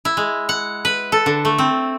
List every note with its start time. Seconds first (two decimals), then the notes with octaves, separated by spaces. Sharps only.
0.05 E4
0.17 G#3
0.49 F#5
0.85 B4
1.12 A4
1.26 D3
1.45 A3
1.58 C4